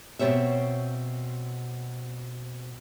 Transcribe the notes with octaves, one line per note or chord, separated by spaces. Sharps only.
B2 C4 G4 C#5 E5